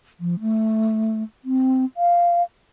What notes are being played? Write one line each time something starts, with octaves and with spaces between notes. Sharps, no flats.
F3
A3
C4
F5